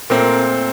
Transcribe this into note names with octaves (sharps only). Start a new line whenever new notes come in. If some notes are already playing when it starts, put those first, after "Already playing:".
A#2 A3 C4 A#4